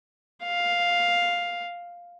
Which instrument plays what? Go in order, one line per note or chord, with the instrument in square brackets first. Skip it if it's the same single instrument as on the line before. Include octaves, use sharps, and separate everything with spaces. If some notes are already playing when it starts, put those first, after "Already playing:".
[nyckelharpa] F5